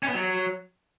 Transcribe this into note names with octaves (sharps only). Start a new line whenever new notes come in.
C#4
B3
F#3